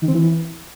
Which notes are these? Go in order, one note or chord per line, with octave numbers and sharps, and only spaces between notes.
D#3
C4
E3